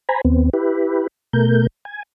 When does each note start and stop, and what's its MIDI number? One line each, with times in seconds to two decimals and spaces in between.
0.09 0.21 72
0.09 0.21 80
0.09 0.21 82
0.09 0.21 83
0.25 0.50 39
0.25 0.50 59
0.25 0.50 60
0.53 1.07 64
0.53 1.07 67
0.53 1.07 71
1.33 1.67 47
1.33 1.67 57
1.33 1.67 70
1.33 1.67 91
1.85 2.03 80